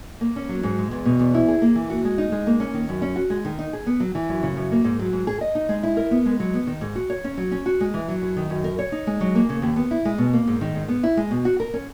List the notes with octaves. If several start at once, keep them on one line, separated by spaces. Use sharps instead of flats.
A#3
C#4
F#3
G#2
G#3
E2
B2
E2
E4
G#4
A#3
E3
F#4
G#3
D#4
G#3
A#3
C#4
D#3
F#2
C#4
F#4
G#3
D#3
D#4
G#4
B3
F#3
E3
F#2
C#3
F#2
A#3
G#2
F#3
G#2
G#4
D#5
D#4
G#3
E4
A#4
B3
G#3
F#3
B3
D#3
G#2
F#4
C#5
C#4
F#3
C#4
F#4
G#3
E3
F#3
F#2
D#3
F#2
A#4
C#5
D#4
G#3
F#3
A#3
C#3
D#2
B3
E4
G#3
B2
A#3
G#2
D#3
G#2
B3
E4
G#3
B2
F#4
A#4
C#4